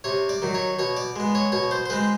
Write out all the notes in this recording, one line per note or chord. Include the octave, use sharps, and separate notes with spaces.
C3 C#5
D5
D#3 F#3
C#5
B2 C#5
D5
G#3 B3
C#5
B2 C#5
C5
C5
G#3 C4 B4